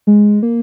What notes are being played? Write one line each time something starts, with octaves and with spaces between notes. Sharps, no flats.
G#3
A#3